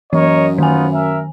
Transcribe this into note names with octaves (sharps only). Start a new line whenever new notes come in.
F#2 E3 A#4 C#5 D#5
D#3 B3 D#4 F4 G#5
A#4 E5